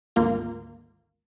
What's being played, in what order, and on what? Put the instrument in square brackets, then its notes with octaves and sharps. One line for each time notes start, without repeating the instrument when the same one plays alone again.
[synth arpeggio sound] G#1 D2 A#3 F4